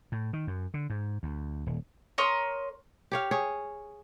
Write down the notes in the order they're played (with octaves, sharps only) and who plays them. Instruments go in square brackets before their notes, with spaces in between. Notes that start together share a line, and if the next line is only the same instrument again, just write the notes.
[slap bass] A2
D#3
F#2
D3
G#2
D2
D#1
[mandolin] A#4 C#5 C6 D#6
[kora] G4 C#5 F5
G#4 C#5